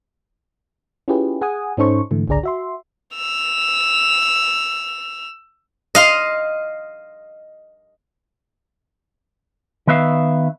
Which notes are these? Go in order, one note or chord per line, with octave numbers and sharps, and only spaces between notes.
C#4 E4 F4 G4 G#4 B4
G#4 F#5 G#5 D#6
G#2 C#4 D#4 A4 C5 C#6
G#2 D3 E3 A3
G#1 C#2 D3 G#4 D5 A#5
F#4 E5 C6
E6 F7
D#5 F5 C6
D#3 B3 B4 E5 F5